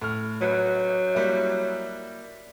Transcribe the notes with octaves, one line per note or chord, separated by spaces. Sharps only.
A2 F6
F#3 B4
G3 A#3 E4